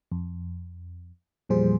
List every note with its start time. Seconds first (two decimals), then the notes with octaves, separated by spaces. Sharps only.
0.12 F2
1.49 E2 A#2 F3 G3 G#4 C5